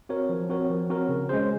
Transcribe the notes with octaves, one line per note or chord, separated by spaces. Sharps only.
C4 F#4 A#4 C#5
F3
C4 F#4 A#4 C#5
F3
C4 F#4 A#4 C#5
C#3
G#3 C#4 G#4 C5